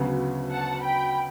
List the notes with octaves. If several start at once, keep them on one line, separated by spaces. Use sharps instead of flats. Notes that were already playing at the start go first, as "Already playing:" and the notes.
Already playing: D2 C#3 F#3 B3
F#5 A5
G5 B5